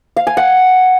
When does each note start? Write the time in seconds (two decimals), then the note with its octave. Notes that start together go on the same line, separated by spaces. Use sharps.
0.16 F5
0.27 G#5
0.37 F#5